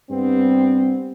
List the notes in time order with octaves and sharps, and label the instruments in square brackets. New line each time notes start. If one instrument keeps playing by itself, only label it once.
[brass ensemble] G2 B3 C4